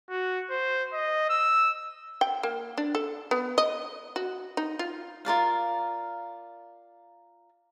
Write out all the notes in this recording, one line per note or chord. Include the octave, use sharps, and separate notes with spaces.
F#4
C5
D#5
E6
G5
A#3
D4
A4
B3
D#5
F#4
D#4
F4
F4 A#4 D5 F5